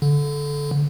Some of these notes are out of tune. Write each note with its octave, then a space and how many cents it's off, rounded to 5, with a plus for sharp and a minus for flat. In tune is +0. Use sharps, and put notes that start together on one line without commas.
D3 -20